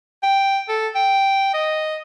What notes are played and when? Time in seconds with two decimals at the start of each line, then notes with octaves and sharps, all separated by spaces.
0.23 G5
0.69 A4
0.95 G5
1.54 D#5